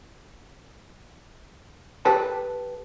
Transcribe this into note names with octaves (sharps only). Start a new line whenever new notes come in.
G4 A4 B4 G5 A5